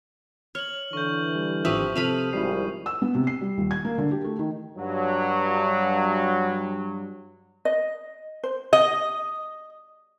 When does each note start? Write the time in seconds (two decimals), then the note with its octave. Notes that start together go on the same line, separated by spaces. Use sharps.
0.55 C#5 F6 F#7
0.93 D3 E3 C#6 G6
1.35 G3
1.65 G#1 F3 G4 B4 E5 C#6 D#6
1.96 C3 F3 A4 F5 B5 F6 D#7 F7
2.33 G#1 G3 E4 C7
2.86 E6
3.02 B3
3.15 C3
3.27 C7
3.41 G3
3.58 D#1
3.71 G#6
3.85 A#3
3.98 D3
4.11 G4
4.25 A3
4.39 D#3
4.77 G2 F#3
7.65 D#5
8.43 C5
8.73 D#5